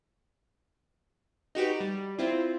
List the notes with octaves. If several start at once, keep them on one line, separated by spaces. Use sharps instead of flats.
D#4 F#4 G4 B4
G3
C4 E4 F4